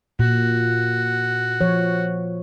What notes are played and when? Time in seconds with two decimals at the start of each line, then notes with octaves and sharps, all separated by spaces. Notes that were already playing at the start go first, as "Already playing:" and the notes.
0.19 A#2 F#4
1.61 F3 C#5